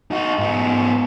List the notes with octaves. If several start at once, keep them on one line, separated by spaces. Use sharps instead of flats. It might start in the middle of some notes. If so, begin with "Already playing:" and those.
D#4 F#4
G#2 B3